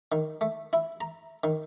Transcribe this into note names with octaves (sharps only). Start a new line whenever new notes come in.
D#3
A3
E4
A#5
D#3